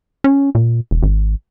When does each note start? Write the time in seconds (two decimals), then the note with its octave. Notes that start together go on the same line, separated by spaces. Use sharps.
0.24 C#4
0.55 A#2
0.91 E1
1.03 G#1